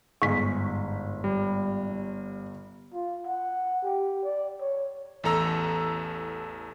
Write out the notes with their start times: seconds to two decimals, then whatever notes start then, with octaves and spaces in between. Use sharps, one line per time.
0.22 G1 G#2 G#4 D#5 C#6 B6
1.24 G3
2.94 F4
3.27 F#5
3.83 G4
4.24 D5
4.61 C#5
5.24 A1 E2 A4 A#5 E6